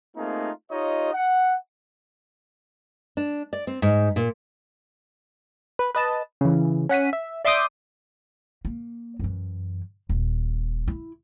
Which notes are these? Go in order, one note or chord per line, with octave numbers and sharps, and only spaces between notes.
A3 A#3 C4 D#4 F4 G#4
D#4 F4 G4 C#5 D#5
F#5
D4
D5
C4
G#2
A#2
B4
B4 D#5 A5
C#3 E3
C#4 F#5 B6 D#7
E5
D5 E5 C6 D6 D#6 G6
A#3
F#2 E3
D#1
E4